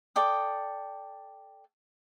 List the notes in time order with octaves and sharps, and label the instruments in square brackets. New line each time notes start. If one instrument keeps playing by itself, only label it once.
[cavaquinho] A4 D5 G5 D#6